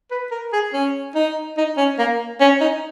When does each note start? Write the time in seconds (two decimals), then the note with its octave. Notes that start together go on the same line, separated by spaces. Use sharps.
0.11 B4
0.31 A#4
0.53 G#4
0.73 C#4
1.15 D#4
1.57 D#4
1.77 C#4
1.99 A#3
2.41 C#4
2.61 D#4